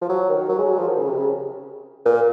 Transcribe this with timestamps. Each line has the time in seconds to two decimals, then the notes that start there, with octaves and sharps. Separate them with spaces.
0.01 F3
0.09 F#3
0.29 D#3
0.49 F#3
0.59 G#3
0.68 F#3
0.78 F3
0.88 D#3
0.97 C#3
1.08 C3
1.17 C#3
2.05 A#2